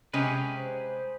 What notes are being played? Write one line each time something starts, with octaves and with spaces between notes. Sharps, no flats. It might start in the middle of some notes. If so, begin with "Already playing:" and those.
C3 G#3 C#4 G4 G#4 B4
C5